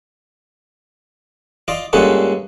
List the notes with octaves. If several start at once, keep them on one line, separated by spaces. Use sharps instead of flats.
F4 D5 D#5
G2 A#2 G#3 C#4 A4 F#5